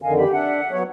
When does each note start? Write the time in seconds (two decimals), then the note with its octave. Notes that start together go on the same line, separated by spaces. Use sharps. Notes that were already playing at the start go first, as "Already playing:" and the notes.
0.02 F2 D3 D#3 D#5 F5 G#5
0.16 G4 B5
0.32 D4 E5 F#5
0.71 F#3 B3 C#5